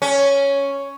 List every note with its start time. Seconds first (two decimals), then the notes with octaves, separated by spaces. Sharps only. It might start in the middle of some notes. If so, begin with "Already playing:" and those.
0.02 C#4